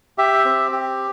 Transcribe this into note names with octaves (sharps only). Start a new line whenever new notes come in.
G4 E5
C4
G4